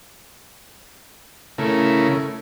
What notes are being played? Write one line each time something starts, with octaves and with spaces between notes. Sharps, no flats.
C#3 A3 E4 A#4